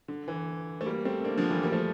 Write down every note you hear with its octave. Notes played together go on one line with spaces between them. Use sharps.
D3
E3
A3
G3 A#3
A3 C4
A#3 D4
D3 F3
E3 G3
G3 A#3
F3 A3